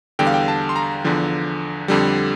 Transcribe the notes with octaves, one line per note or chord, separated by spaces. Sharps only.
E2 D3 G3 G5
F5
G5
A5
C6
A#5
E2 D3 F3
F2 D3 G3